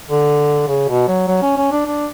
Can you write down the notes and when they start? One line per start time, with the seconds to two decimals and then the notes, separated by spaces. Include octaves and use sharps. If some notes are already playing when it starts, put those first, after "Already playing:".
0.10 D3
0.68 C#3
0.88 B2
1.08 F#3
1.27 F#3
1.42 C#4
1.57 C#4
1.72 D4
1.86 D4